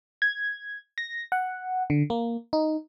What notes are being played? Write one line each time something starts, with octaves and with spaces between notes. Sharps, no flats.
G#6
A#6
F#5
D3
A#3
D#4